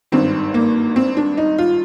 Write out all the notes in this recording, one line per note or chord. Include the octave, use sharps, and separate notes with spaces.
G#1 G2 D#3 C4
A#3
C4
D4
D#4
F4